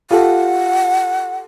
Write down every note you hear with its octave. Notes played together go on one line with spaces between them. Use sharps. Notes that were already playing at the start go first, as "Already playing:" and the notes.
F4 G4 A4 F#5